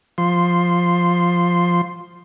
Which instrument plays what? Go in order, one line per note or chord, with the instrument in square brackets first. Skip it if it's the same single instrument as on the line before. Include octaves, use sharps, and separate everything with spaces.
[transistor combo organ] F3 C6